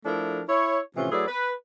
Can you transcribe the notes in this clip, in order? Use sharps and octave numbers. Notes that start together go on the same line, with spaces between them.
F3 A3 D4 E4 A4 A#4
E4 C#5
A2 C3 E3 F3 C#4 F4
F#3 A3 E4 G#4 B4 D5
B4